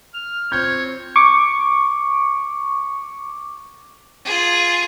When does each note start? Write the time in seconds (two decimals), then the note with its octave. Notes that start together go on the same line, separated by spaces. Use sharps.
0.15 F6
0.52 C4 F4 C5 C#5 G6
1.16 C#6 D6
4.25 F4 G#4